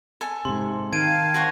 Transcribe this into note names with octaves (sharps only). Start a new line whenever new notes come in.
A4 G#5
G#2 C3 C6
D#3 F5 G5 A5 G#6 D7 D#7
F#4 C5 C#5